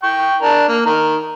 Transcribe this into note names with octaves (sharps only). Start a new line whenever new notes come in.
G5 C#6
D4 A#4
A#3
D#3 A#4